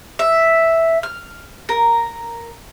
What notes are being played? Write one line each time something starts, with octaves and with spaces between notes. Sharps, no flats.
E5
F6
A#4